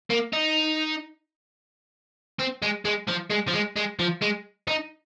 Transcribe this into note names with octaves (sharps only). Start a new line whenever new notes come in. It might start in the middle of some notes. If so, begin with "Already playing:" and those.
A#3
D#4
C4
G#3
G#3
F3
G#3
F3
G#3
G#3
F3
G#3
D#4